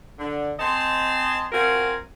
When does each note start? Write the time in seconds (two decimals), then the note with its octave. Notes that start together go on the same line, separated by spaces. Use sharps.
0.19 D3
0.59 C4 D#5 G#5 A5 C6
1.52 C4 F4 F#4 A#4 G#5